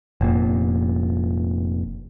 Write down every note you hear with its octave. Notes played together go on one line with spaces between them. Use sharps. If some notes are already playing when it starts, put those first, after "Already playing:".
F1 A#2